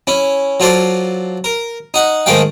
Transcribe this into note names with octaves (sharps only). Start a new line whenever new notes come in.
C#4 E4
F#3 F4 A4 C5 D5
A#4
D#4 F#5
G#2 D#3 G#3 A3 F5 G5